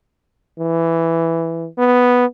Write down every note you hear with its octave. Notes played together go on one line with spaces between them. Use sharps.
E3
B3